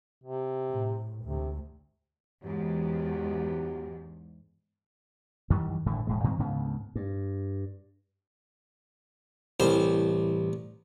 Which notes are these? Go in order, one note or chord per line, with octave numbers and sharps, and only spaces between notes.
C3
A2
D2 G#2 C3
E2 G#2 F#3 B3 G4
F#2 D#3 E3 G3
G#1 A2 D3 A3
E1 A2 G#3
G2 D#3 F3 C4
D2 G#2 C#3 B3
G2
C2 A2 E3 G3 C5